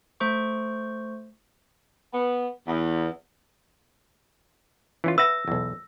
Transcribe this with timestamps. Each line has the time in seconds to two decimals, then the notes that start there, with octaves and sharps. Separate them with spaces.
0.20 A3 C5 C#6
2.14 B3
2.68 E2
5.04 E3 C#4 F4
5.18 B4 E5 F#5 E6 A#6
5.48 B1 E2